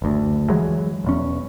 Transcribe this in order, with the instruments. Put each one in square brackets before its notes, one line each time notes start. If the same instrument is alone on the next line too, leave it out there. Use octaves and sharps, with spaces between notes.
[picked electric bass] F#1 D2
E3 F#3 G#3
E1 E2 C#4